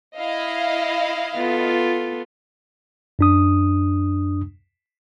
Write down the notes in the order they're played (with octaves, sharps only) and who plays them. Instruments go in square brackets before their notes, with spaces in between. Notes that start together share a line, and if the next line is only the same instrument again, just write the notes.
[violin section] E4 D#5 F5
[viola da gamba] B3 F4 A4
[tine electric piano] F#2 D4 D#6